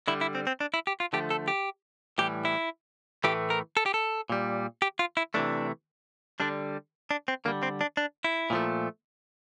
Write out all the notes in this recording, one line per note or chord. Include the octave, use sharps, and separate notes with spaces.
D3 G3 E4
E4
C4
C4
D4
E4
G4
F4
D3 F3 A3 G4
A4
G4
A2 E3 G3 G4
E4
A2 E3 A3 G4
A#4
A4
G4
A4
A#2 G3
G4
F4
E4
C3 E3 A3 D4
D3 G3 D4
D4
C4
D3 G3 A#3
C4
D4
D4
E4
A#2 F3 A3